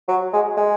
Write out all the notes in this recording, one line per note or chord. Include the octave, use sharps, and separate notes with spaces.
F#3
G#3
G#3